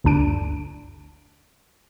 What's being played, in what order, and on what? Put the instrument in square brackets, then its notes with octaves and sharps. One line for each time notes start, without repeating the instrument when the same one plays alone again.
[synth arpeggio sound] G1 D2 D4 D7